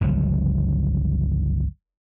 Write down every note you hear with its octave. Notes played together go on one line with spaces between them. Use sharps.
G1 C#2 F3 F#3